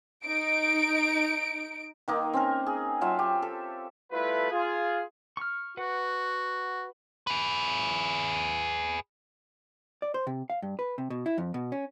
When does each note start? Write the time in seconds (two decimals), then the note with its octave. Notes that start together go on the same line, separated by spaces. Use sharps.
0.24 D#4 D7
2.08 D#3 A#3 D#4
2.33 C4 C#4 A#4
2.66 G#4
3.01 F#3 F4 E5 A5
3.19 G4
3.42 A4
4.12 G3 A3 E4 F4 A4 B4
4.51 F4 G#4
5.37 C#6 F6
5.77 F#4 B4 F#5
7.27 G#4 B4
10.02 D5
10.14 C5
10.27 C3
10.50 F5
10.62 G2
10.79 B4
10.98 C3
11.10 B2
11.26 E4
11.38 F2
11.54 B2
11.72 C#4